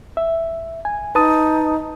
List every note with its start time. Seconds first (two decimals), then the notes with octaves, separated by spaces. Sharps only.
0.17 E5
0.85 G#5
1.15 D#4 B4 A5 D#6